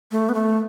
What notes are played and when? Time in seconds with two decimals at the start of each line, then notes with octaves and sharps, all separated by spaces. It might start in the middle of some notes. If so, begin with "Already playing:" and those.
0.12 A3
0.29 B3
0.34 A3